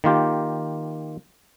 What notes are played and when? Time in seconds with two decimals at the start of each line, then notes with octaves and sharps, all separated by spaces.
0.04 D#3 A#3 F4 G4